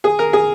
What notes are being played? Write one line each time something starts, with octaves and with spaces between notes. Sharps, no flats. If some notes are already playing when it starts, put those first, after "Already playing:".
G#4
A#4
G#4